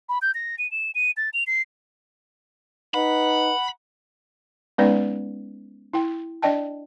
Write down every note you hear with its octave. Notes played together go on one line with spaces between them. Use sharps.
B5
G6
A#6
D#7
E7
D#7
A6
F7
C7
D#4 B4 F#5 B5
G#3 B3 C#4 D#4 B4 D5
E4 G5
D4 D5 D#5 G5 A5